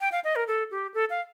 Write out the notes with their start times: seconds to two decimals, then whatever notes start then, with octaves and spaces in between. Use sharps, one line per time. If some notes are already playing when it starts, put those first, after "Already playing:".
0.01 G5
0.12 F5
0.24 D#5
0.36 A#4
0.47 A4
0.71 G4
0.94 A4
1.10 F5